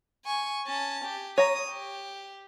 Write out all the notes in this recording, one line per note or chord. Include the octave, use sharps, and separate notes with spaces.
G#5 C#6
C#4 A5
G4
C#5 A#5 D#6
G4